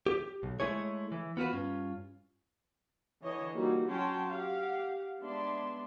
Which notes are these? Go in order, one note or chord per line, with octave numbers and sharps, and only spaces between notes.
G4
B1
G#3 A3 E4 G#4 C#5
E3
B3 F4 F#4 B4
G2 C#4 F4
D3 E3 C#5 D#5
G3 A#3 D#4 F4 F#4 G#4
F#3 C#4 F#4 G5 A5 C6
G4 F5 F#5
G#3 B3 D4 D5 E5 C6